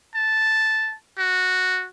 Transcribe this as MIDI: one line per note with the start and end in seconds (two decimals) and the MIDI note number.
0.15 0.95 81
1.18 1.87 66